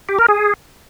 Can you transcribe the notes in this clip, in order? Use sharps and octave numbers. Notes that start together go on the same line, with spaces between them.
G4
A#4
G#4